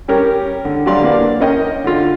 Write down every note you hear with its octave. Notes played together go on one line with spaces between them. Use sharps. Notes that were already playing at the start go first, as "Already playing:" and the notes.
G3 C#4 G4 A#4
D3
D3 F#3 G3 D5 F5 C6
A#3 D4 B4 D5 F5
C#4 A#4 D#5 G5
D3 F4